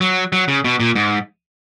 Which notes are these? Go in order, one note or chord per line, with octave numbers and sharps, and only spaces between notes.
F#3
F#3
C#3
B2
A#2
G#2